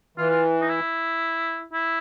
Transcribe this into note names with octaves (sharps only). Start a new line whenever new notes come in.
E3 F4
F4
D#4
E4
E4